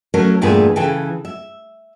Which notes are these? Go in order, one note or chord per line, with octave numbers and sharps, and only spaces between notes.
F#3 A3 C#4 A#4
E2 G2 A#2 A3 G#4 B4
C#3 E3 G#4 A4 G5
E5